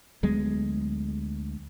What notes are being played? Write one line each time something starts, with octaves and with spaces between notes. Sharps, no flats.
D2 F#3 G#3 B3